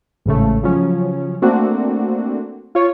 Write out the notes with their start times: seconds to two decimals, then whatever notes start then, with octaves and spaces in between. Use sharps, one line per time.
0.25 A1 G#2 C#3 A3
0.63 C#3 F3 F#3 C#4
1.42 A3 A#3 C4 D4 F#4
2.75 F4 C#5